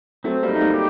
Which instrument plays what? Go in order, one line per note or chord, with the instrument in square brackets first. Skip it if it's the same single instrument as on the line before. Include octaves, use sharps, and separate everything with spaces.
[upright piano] F#3 A3 [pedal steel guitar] C4
[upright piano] G3 A#3
[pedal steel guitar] D#4
[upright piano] A3
G3 A#3
[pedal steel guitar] G4